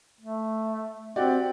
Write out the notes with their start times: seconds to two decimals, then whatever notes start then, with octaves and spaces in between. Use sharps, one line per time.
0.21 A3
1.16 C4 F#4 G4 D5